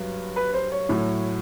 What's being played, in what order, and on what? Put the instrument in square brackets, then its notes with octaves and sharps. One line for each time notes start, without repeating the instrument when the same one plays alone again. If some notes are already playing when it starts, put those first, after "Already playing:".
Already playing: [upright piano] G2 F#3
B4
C5
C#5
A2 F#3